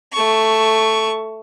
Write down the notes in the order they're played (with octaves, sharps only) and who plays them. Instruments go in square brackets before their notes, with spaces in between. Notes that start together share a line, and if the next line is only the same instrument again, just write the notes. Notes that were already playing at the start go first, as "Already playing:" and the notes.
[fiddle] A3 C#6